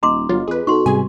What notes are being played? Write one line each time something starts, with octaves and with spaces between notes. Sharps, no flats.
D#1 D#5 A#5 C6 D6
G1 F#3 F4
F2 G#4 B4
B2 D#4 F#4 A4 C6 C#6
G#2 C3 G3 G#4 G#5